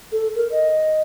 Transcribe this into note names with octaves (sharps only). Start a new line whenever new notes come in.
A4
A#4
D#5